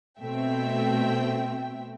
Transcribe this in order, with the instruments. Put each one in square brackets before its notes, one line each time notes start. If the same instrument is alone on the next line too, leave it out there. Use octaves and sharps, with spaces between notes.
[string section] B2 A3 C4 E5 G5